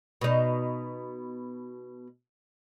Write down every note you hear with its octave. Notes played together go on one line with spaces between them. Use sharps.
B2 D#4